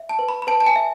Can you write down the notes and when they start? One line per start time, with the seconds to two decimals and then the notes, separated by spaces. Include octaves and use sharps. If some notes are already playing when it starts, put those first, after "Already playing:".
Already playing: E5
0.09 A5
0.19 B4
0.29 B5
0.42 B5
0.47 B4 A5
0.60 A5
0.66 G#5
0.76 E5